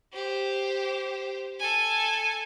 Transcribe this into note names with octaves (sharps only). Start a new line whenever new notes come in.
G4 C5
A4 G#5